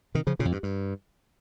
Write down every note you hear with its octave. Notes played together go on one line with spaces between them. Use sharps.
C3 D#3
C#3 F3
A#2 C#3
F2
G2
G2